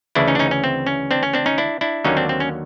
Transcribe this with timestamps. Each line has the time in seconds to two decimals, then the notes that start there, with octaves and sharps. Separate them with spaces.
0.15 D2 C#3 E3 D4 E4
0.28 C#4 D#4
0.35 D4
0.39 C#4 D#4
0.51 C#4
0.64 C4
0.87 C#4
1.11 C4 D4
1.23 C#4
1.33 C4 D4
1.46 C#4 D#4
1.58 D4 E4
1.81 D4 E4
2.05 D#2 D3 F#3 A#3 C#4 D#4
2.17 C4 D4
2.29 C4
2.40 C#4